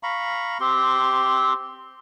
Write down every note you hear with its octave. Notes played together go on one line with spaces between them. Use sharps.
F5 A#5 B5 C#6
C4 G4 C6